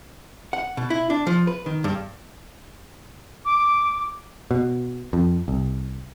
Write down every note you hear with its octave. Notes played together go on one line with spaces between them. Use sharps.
F#5
B2
E4
D4
F3
B4
D#3
G2
D6
B2
F2
C2